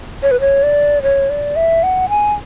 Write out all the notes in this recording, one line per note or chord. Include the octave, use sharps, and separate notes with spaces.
C#5
B4
C#5
D5
C#5
D5
E5
F#5
G#5